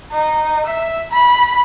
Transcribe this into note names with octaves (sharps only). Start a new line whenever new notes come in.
D#4
E5
B5